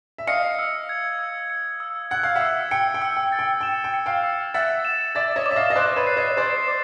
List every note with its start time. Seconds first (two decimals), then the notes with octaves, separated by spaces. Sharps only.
0.18 E5
0.27 D#5 F5 C#7
0.59 E6
0.89 G#6
1.19 E6
1.50 C#7
1.80 E6
2.11 F#5 G#6
2.23 F5
2.35 E5 F#5
2.41 E6
2.71 G5 C#7
2.94 G5
3.02 E6
3.17 G5
3.32 A6
3.39 G5
3.61 G5 E7
3.84 G5
3.94 C#7
4.06 F5 G5
4.24 E6
4.54 E5 F#5 A6
4.85 E7
5.15 D5 E5 A6
5.36 C#5 D#5
5.46 D6
5.51 E5
5.56 D#5 F5
5.70 D#5
5.76 C5 D5 F#6
5.96 B4 C#5
6.07 C7
6.17 C#5 D#5
6.37 C5 D5 A6
6.68 D6